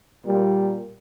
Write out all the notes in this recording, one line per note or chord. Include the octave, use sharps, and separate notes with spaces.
A#2 G3 A#3